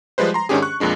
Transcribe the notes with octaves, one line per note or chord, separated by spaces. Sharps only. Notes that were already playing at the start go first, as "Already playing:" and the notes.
F3 G3 G#3 B4 C5
A#5 C6
G#2 D#3 C#4 D4 G4 G#4
C#6 F#6
F2 A#2 G#3 D4